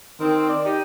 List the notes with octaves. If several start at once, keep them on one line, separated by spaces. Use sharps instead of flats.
D#3 C4
D5
D#4 G4